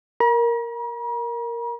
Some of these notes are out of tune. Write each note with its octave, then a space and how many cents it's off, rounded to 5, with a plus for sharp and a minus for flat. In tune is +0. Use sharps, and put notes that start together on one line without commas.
A#4 +0 A#5 +45